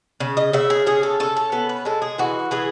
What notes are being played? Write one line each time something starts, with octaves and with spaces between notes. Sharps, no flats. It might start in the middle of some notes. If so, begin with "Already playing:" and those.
C#3
D#5
C#3 E5
G#4
C#4 G#4
A4
C#4 A4
A4
B3 A4
B4
G#3 A4
G#4
E3 F#4
E3 G#4